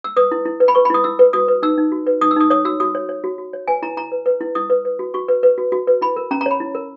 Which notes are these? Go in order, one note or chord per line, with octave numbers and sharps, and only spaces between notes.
E6
B4 D#6
E4
E4
B4
B5
B4 C#6
B5
E4 D#6
E4 E6
B4
F#4 D#6
B4
D#4 E6
D#4
F#4
B4
D#4 D#6
E6
D#4 D#6
C#5 D#6
F#4 E6
F#4 D#6
C#5
C#5
F#4
F#4
C#5
B4 G#5
E4 A#5
E4 A#5
B4
B4
E4
E4 D#6
B4
B4
F#4
F#4 C#6
B4
B4
F#4
F#4
B4
E4 B5
A#4
C#4 A#5
A#5
C#5 B5
E4
A#4